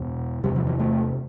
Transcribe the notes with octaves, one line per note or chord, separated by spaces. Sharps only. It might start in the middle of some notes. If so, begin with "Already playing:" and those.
Already playing: E2 B2
E2 C3 G3
F3
E3
A3